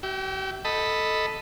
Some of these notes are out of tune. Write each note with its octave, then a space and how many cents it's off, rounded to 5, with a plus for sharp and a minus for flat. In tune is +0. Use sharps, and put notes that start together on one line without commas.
G4 -45 E5 +0 G5 +0
A4 +0 D#5 +0 B5 +0